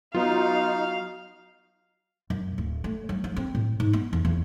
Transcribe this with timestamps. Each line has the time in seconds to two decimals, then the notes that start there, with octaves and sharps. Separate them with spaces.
0.15 F#3 B3 D#4 F4 F#4 F5
2.30 F#2
2.58 D1
2.84 A3
3.09 F#3
3.24 F3
3.36 C4
3.55 A2
3.80 G#2
3.93 B3
4.13 E2
4.25 E2